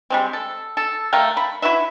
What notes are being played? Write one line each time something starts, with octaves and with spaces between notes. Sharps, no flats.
G3 G#3 C4
A4
A4
A3 A#4 F5 G5
B5
E4 F#4 B4 E5